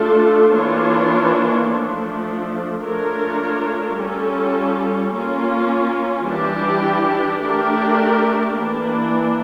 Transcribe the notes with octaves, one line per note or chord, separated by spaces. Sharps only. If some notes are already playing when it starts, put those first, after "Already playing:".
Already playing: A3 D4 F4 A4
E3 A#3 D4 F4 C#5
F3 A3 D4
A3 D4 F4 A#4 C#5
G3 C#4 F4 A4
A#3 C#4 F4
E3 G3 D4 G4
A3 D4 G4 A#4
E3 A#3 D4